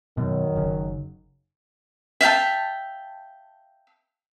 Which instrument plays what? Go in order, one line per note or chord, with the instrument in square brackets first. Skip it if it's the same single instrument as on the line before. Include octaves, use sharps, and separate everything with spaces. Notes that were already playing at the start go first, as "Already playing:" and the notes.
[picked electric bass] F#2 B2 [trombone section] D#3 F#3
[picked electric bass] F#1 C#3
[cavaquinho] E5 F5 G5 A5